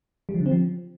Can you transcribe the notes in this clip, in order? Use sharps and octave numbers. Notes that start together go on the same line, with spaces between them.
G3
F3
D3
C4
F3